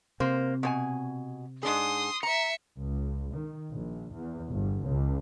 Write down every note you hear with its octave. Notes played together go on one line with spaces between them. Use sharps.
C3 A#3 C4 C5
B2 C5 G#5
G#2 D4 G#4 C6 D#6
E5 A#5 C#7
C#2
D#3
A#1
E2
G1
C#2